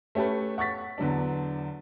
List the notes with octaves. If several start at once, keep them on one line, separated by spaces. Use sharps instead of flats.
A3 C#4 G4 A4 B4
F#5 C#6 A6 B6
E2 D3 F#3 D4